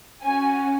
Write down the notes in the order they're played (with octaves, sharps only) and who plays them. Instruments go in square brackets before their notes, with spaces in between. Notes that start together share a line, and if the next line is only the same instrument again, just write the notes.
[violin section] C#4 F#4 G#5